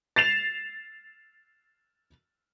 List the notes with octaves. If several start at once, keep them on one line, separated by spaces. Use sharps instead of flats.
A6 C7 E7 F7